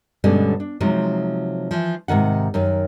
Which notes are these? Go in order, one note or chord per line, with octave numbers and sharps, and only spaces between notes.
G2 B2 D3 G3 G#3 C#4
D4
C3 F3 F#3 G#3 D#4 C5
E3 F3
G#2 C3 D#3 F#5
F#2 D#3